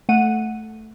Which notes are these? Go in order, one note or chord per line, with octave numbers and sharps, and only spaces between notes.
A3 F#5 D#7